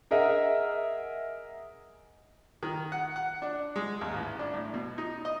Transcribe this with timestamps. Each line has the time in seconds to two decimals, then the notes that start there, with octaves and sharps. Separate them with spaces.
0.11 G#4 A#4 D#5 E5 F#5
2.63 D#3
2.92 F#5
3.16 F#5
3.42 D4
3.76 G#3
4.01 D#2
4.14 A1
4.39 D4
4.54 A2
4.74 B2
4.98 D#4
5.25 D#5